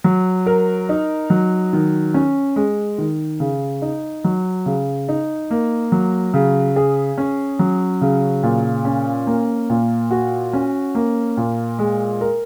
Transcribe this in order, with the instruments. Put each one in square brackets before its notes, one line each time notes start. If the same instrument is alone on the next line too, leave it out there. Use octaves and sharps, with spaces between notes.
[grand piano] F#3
A#4
D#4
F#3
D#3
C#4
G#3
D#3
C#3
D#4
F#3
C#3
D#4
A#3
F#3
C#3
G#4
C#4
F#3
C#3
A#2
C#4
A#3
A#2
F#4
C#4
A#3
A#2
G#3
A#4